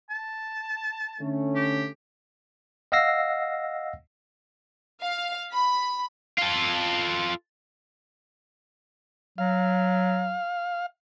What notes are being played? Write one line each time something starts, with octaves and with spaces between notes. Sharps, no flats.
A5
D3 A3 C#4
G4
D#5 F5 F#5 E6 A#6 C7
F5
B5
F4 A4
F#3 F5